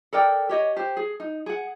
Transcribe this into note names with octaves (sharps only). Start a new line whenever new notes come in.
A4 A#4 D5 G5
G4 C#5 D#5
G4 C5
G#4
D#4
G#4 F#5